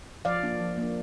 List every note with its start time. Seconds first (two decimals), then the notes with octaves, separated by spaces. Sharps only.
0.25 F3 D5 F5
0.43 A#3 D4
0.61 F3
0.78 A#3 D4